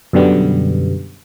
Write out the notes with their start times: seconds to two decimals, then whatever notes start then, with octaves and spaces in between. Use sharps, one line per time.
0.13 F#2 B2 D3 G3 B3